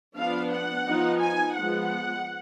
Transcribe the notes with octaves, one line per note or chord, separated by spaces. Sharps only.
F3 B3 D4 F5
F#5
F3 B3 D#4
G#5
F3 G#3 B3 F#5